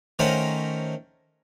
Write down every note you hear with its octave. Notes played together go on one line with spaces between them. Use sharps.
D#3 A3 C#4 A#4 C5 F#5